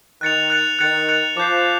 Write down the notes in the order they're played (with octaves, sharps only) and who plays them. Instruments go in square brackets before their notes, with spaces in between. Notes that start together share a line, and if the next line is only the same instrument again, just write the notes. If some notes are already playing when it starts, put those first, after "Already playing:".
[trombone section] D#3 [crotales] F#6 A6 C#7 F7
[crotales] F#6 A6 C#7 F7
[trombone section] D#3 [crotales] F#6 A6 C#7 F7
[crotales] F#6 A6 C#7 F7
[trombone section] F3 [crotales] D6 G6 C7